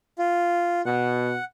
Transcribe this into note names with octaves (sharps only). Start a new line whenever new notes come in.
F4
B2 F#5